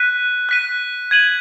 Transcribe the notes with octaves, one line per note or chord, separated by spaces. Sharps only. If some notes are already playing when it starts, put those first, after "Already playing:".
Already playing: F#6 B6 D#7
F#6 B6 D#7
G#6 D#7 F#7